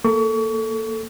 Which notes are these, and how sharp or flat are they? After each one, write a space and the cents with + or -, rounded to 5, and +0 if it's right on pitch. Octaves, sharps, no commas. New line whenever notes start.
A#3 -10 A4 +0 C#6 +35